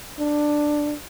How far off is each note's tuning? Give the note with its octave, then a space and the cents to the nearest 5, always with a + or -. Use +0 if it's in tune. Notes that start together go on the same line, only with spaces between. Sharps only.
D4 +10